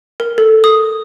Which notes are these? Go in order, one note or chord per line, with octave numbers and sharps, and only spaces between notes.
A#4
A4
D#6